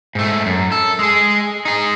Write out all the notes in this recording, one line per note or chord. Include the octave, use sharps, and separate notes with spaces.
G#2 A3
F#2
A4
G#3 G#4
D#4 G#4